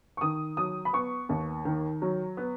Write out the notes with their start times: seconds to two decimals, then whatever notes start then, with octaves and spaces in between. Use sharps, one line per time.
0.17 C#6
0.21 D#3 D#6
0.57 F#3 D#6
0.85 B5
0.93 B3 C#6
1.29 D#2
1.65 D#3
2.02 F#3
2.37 B3